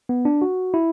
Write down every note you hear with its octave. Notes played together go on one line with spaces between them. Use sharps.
B3
D4
F#4
E4